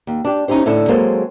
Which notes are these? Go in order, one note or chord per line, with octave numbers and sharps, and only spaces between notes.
D#2
D4 G4
C#4 D#4 E4 G4 C5
A2 D3 E4 A4
F#3 G#3 A#3 C4 A4 C5